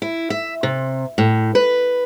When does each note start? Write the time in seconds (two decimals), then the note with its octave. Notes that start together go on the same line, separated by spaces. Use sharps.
0.02 E4
0.30 E5
0.63 C3
1.18 A2
1.55 B4